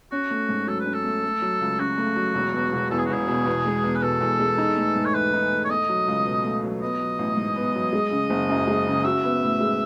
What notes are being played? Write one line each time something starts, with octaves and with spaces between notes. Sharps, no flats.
C#4 F#4
A3
G#2
F#3 A4
B4
C#4
A4
A3
A3
F#3
C#2
C#3 F#4
A3
F#3
E1
B2
E1
E2 A4
G#4
F#4
E1 G#4
B2
E2
G#3
E2
B4
B2 A4
E2
G#3
D#4
A3
G#2
C#5
E3 B4
D#4
A3
C#5
A3 D#5
F#3
C#2
B2
A3
F#3
B3 D#5
F#3
A1
G#2
B3
F#3
G#3
C#3
F#1
F#2
G#3
C#3
F#4 E5
B3
A2
G#3